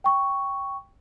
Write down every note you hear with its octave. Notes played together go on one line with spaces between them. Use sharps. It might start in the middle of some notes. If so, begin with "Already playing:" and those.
G5 C#6